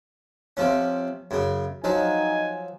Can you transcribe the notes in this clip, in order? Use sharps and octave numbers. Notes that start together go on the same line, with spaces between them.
C3 F3 C#4
F#2 C#3
F3 F#3 D#4 G#5